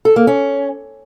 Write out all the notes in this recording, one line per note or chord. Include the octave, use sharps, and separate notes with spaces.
A4
A#3
C#4